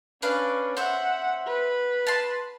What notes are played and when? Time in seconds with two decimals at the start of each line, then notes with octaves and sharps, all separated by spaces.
0.22 C#4 D4 B4 F5
0.77 C5 E5 F#5
1.47 B4
2.07 A5 C6